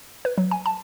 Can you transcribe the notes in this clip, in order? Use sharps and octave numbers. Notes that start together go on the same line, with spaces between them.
B4
F#3
G#5
A5